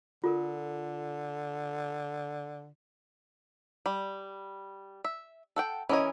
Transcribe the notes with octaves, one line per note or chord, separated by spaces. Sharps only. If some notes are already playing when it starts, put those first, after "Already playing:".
D3 F4 A4 A#4
G3
E5
A4 F#5 G5
E3 C#4 A#4 D#5 G#5